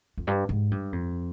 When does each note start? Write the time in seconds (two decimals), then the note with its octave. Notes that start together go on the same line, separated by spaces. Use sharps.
0.17 F2
0.27 G2
0.49 G#2
0.71 G2
0.92 F2